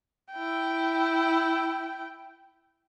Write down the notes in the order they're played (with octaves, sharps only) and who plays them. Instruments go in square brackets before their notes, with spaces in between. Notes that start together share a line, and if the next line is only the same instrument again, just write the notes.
[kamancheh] E4 G5